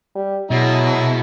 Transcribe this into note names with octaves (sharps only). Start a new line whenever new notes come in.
G3
B2 F#3 G#3 E4 E5